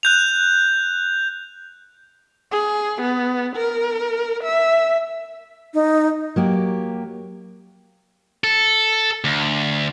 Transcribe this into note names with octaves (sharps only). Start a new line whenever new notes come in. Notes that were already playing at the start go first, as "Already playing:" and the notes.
F#6 G6 F7
G#4
B3
A#4
E5
D#4
F#3 A#3 G4
A4
D2